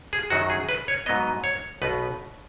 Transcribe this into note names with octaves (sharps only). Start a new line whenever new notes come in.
G#4
F#2 D#3 F#3 D#4 F#4
G#4
B4
C#5
G#2 F#3 B3 D#5
C#5
B1 B2 B3 D#4 B4